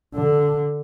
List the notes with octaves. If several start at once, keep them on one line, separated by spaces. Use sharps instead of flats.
D3